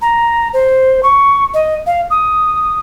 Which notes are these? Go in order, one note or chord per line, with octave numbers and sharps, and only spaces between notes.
A#5
C5
C#6
D#5
F5
D#6